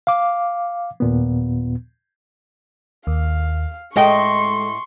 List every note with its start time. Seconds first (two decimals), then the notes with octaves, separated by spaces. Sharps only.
0.07 F5 D6
1.00 D#2 A#2 B3
3.07 D#2 F5
3.96 A2 G#3 A4 D#5 G5 C6 C#6